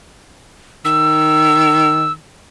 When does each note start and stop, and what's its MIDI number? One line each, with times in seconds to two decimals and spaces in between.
0.85 2.17 51
0.85 2.12 88